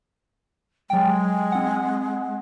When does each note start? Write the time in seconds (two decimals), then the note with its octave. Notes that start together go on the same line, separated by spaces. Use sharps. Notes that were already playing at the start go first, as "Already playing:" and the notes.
0.90 F#3 G#3 G5
1.52 C4 F#5